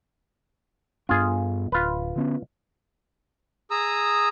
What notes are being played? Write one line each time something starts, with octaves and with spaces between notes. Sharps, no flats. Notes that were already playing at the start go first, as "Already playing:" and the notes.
G2 B3 D4 F4 G#4
D1 F4 B4
D3 B3 C#4
G#4 A#5 D#6 E6